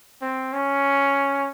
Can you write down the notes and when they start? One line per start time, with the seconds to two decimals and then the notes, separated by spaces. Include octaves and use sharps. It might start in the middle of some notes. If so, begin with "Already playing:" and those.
0.21 C4
0.53 C#4